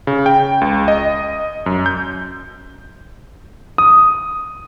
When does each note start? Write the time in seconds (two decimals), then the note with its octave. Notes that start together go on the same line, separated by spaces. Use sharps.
0.07 C#3
0.26 G5
0.61 C#2
0.88 D#5
1.66 F#2
1.86 G6
3.78 D#6